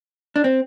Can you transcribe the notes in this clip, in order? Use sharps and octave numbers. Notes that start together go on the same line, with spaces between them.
D4
C4